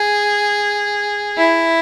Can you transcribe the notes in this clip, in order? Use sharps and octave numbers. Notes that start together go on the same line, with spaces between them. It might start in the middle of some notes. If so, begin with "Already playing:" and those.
Already playing: G#4
E4